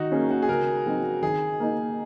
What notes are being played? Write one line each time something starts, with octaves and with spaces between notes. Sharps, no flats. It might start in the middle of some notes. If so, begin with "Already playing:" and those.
Already playing: D#3 D#4 F#4
A#3 C#4 G#4
F#4
G#4
C#3 A#4
F#3 C4 D#4
D#3 G#4
A#3 D#4